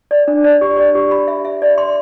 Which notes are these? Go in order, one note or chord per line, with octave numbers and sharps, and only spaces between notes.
D5
D4
D5
G4
D5
G4
B5
E5
E5
D5
C6